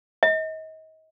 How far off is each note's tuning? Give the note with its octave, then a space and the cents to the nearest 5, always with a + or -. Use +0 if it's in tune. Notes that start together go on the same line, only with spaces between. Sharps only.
D#5 +35